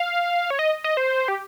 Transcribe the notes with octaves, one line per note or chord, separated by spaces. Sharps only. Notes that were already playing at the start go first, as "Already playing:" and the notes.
Already playing: F5
C#5
D#5
D#5
C5
G4